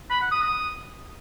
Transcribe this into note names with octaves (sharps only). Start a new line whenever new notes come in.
B5
F#5
D#6
D#6